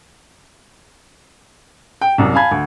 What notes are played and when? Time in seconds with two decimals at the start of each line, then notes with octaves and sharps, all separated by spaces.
2.01 G5
2.18 C2 F#2
2.34 F5 G#5 A5 B5 G#6
2.51 D2